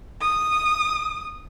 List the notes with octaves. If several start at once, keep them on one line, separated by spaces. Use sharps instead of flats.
D#6